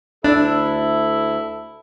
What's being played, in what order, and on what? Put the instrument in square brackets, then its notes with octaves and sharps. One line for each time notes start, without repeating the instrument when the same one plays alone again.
[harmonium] D2 A4 [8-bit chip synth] D4 [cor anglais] E4